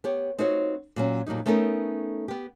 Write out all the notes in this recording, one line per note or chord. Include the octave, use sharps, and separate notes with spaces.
B3 G4 C#5
C4 D#4 F4 F#4 B4 C#5
A#2 F#3 C#4
F2 A#2 F#3 G3 D#4
A3 B3 C#4 D#4 A4 A#4
B3 G4